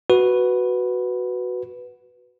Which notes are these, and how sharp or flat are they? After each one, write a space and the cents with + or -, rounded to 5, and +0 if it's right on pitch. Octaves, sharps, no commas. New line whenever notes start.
F#4 +0 B4 +0